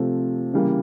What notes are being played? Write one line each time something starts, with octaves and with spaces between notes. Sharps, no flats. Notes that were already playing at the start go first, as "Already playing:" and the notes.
Already playing: C3 F3 A3
C#3 E3 G3 A#3